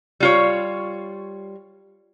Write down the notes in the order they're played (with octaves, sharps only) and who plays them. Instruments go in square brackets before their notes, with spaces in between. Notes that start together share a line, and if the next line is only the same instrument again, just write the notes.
[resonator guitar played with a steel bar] G3 F4 C#5